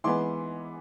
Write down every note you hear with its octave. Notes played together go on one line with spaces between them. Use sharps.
E3 G#3 B3 C6 D6